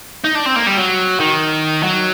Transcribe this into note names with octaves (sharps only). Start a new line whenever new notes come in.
D#4
D4
C4
A#3
G3
F#3
D#3
F#3